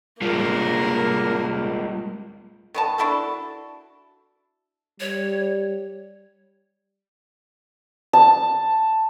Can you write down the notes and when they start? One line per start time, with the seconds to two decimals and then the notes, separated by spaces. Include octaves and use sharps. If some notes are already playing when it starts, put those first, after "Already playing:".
0.21 G3 G#3 A#3 F4 A#4
2.74 D#3 B3 A5
2.98 D4 E4 F#4 A4
5.00 G3 C#5
8.13 A5